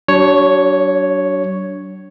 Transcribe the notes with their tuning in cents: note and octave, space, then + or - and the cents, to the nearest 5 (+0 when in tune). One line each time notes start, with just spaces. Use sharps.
F#3 +40 D4 -20 C#5 +0